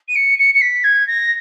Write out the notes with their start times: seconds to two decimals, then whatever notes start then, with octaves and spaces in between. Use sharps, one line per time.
0.08 D#7
0.15 C#7
0.38 C#7
0.54 C#7
0.61 B6
0.84 G#6
1.07 A#6